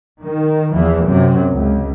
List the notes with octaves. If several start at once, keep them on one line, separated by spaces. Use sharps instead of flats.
D#3
E2 E3 F3
F#2 C3 F#3
C#2